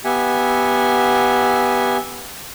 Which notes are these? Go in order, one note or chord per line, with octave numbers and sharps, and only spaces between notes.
B3 G4 E5 F#5 G#5